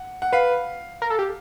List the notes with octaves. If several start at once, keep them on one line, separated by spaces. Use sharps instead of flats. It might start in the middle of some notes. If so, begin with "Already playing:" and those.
Already playing: F#5
F#5
B4 F5
A#4
A4
G4